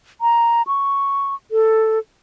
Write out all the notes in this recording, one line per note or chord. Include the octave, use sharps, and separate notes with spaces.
A#5
C#6
A4